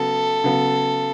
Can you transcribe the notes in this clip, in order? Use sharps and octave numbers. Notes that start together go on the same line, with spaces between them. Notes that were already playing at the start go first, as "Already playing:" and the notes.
Already playing: C#3 F#3 B3 A4
C#3 F#3 B3